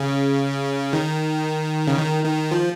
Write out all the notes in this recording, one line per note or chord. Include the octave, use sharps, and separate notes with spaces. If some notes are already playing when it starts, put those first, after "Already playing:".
Already playing: C#3
D#3
C#3
D#3
D#3
F3